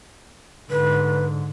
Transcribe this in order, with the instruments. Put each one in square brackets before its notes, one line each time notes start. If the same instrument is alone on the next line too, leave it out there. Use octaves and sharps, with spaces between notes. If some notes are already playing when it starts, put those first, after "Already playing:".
[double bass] G#2 D3 [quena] B4